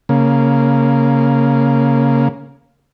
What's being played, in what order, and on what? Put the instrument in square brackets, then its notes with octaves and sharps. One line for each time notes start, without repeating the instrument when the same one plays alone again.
[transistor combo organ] C#3 A#3